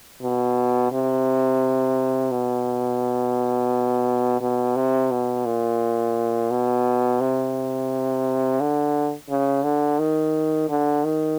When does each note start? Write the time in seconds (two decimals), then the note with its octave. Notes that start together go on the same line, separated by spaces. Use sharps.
0.22 B2
0.92 C3
2.32 B2
4.41 B2
4.76 C3
5.11 B2
5.46 A#2
6.51 B2
7.21 C3
8.60 D3
9.30 C#3
9.65 D3
9.99 D#3
10.69 D3
11.04 D#3